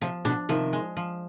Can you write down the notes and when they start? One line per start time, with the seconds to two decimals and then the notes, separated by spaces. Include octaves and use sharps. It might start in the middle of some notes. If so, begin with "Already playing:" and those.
0.01 C3 F3
0.25 B2 D3 D4
0.49 C3 D#3 F3
0.73 G#3
0.97 F3